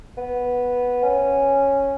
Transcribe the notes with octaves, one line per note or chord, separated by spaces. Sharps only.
B3
C#4